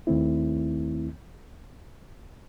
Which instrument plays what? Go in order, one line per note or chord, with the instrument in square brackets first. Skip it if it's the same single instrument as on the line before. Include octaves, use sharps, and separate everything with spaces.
[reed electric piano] D#2 D#3 A3 C4 E4